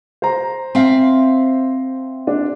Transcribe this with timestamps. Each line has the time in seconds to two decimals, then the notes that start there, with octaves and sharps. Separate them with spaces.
0.22 C5 A#5
0.75 C4 E5 F5
2.27 D4